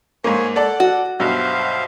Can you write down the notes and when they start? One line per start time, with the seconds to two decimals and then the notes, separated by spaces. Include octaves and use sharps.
0.24 G#2 A#3 C5 C#5 G#5
0.56 A4 D5 F#5 A5
0.80 F#4
1.20 B1 G2 B2 C5 E5 F5